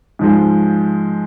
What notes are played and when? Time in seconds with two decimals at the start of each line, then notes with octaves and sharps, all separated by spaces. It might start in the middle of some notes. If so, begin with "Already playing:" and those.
0.19 G#2 F3 G#3